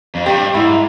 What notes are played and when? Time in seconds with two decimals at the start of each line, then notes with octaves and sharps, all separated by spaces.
0.15 F2
0.26 G2 G4
0.54 G#2 E4